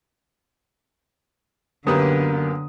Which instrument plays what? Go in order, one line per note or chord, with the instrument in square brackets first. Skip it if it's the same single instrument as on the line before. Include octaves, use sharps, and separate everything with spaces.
[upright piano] F#2 A#3 D#6 [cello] D3 [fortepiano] B3 G4 B4